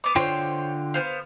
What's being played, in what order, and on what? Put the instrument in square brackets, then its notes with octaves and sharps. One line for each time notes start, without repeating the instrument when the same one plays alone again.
[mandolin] B3 D6
[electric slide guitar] D3 F4 G5 [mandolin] C5 C#5 C6
[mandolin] B3 C5 F5